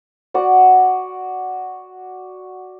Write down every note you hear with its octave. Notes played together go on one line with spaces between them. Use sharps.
F#4 D5 F#5